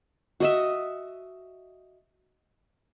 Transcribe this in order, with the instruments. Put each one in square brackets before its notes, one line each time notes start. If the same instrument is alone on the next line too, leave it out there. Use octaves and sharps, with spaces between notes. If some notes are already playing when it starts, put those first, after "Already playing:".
[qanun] F#4 D#5 E5